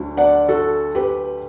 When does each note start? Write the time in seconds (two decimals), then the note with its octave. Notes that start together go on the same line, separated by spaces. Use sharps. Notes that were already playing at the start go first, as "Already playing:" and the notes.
Already playing: D2 D3 F#3
0.17 D5 F#5
0.49 F#4 A4
0.95 G4 B4